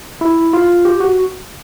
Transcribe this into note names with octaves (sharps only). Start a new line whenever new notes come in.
E4
F4
G4
F#4